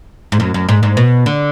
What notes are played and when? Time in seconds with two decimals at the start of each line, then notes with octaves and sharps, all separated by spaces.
0.32 G#2
0.40 F#2
0.54 F#2
0.69 G#2
0.83 G#2
0.97 B2
1.26 D3